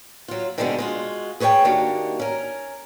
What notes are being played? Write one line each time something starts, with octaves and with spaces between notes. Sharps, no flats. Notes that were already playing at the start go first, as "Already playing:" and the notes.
F#3 F4
B2 D3 D#3 F3 G#3 B3
G#3 F4 F#4
G#4 B4 C#5 D#5 G5 A5
D#3 A#3 D4 F#4 G4
C#4 A#4